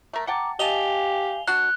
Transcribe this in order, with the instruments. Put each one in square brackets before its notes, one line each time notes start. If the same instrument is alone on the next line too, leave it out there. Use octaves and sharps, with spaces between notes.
[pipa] A3 A#4
[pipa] F#5 G5 A5 [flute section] A#5 D6
[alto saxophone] G4 [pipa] D#5 A5 [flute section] F5 G#5 [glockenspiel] F7 G7
[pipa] D4 F#4 [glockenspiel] F#6